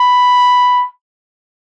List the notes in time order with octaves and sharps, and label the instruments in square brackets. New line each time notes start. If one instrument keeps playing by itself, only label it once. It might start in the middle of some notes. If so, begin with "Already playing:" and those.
Already playing: [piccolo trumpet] B5